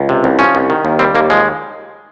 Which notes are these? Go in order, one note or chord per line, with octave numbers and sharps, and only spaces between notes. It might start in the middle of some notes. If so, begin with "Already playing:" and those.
Already playing: C#2
C3
C2
F3 C#4
C2
D#3
D#2
G3 C4
D#2 A#3
F3 G#3